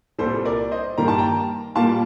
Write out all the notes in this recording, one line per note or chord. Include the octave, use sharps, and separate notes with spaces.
C2 A#2 G3 A4 C5
A#4 D5
C5 D#5
G2 D#3 G3 A#3 A#5
A5
G5 A#5
A#2 G3 A#3 F5 A5